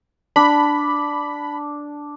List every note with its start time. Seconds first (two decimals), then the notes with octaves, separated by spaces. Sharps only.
0.36 D4 B5